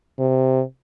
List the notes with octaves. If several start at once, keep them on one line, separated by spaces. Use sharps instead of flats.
C3